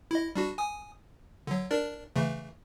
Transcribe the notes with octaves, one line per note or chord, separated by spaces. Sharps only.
E4 D#5
G3 D4 F#4
G#5 D#6
D3 F#3
D4 A#4 D5
C#3 E3 A3